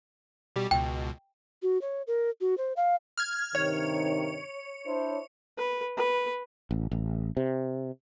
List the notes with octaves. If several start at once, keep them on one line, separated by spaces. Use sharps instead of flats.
B2 G3 G4
C#2 B2 G5
F#4
C#5
A#4
F#4
C5
F5
F6 G#6
G2 C3 D#3 C#5
D4 E4 C5
B4
B4
A1
A1
C3